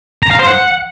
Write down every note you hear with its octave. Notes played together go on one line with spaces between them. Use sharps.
A#5
F5
C5
F#5